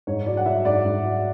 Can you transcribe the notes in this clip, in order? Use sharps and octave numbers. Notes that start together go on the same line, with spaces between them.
G#2 C#5
F#3 D5
F#5
F#3 E5
G#2 D5
G#2
F#3